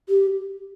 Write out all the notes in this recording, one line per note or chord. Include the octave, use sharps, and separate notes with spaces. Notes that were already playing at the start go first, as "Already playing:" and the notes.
G4